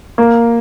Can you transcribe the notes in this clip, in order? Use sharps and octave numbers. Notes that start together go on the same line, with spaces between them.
A#3